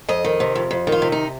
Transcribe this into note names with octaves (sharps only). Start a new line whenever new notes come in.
F2 D#5
D#3
C3
F2
F2
D#3
F4
C3
D#4